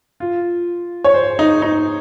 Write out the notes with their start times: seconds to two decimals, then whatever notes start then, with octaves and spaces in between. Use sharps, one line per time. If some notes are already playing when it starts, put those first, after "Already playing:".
0.20 F4
1.04 C#5
1.14 C5
1.39 D#4
1.62 D#4